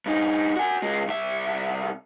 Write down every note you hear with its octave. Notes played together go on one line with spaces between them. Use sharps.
G2 D#4
F#4 G#5
C#2 G#3
C2 E5